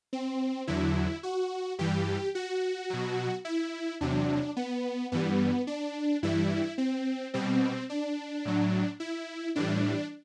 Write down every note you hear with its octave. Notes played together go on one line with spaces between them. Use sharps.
C4
E2 D3 F#3 E4
F#4
G2 E3 G3 G4
F#4
B2 F#3
E4
E2 C3 F#3 D4
B3
G2 E3 G3 B3
D4
G2 E3 G3 E4
C4
B2 G3 C4
D4
A2 F#3
E4
A2 E3 G3 D4